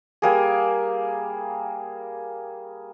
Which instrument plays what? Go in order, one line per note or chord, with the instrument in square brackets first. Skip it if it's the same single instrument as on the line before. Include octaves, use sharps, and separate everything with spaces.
[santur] G3 A#3 G#4